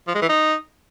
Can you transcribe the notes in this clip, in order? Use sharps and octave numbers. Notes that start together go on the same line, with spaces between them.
F3
G#3
E3
D#4